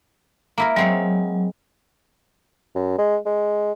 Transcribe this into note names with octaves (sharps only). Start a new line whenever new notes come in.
A#3 E4 A#4
F#3 G#3 C4 C#5
F#2
G#3
G#3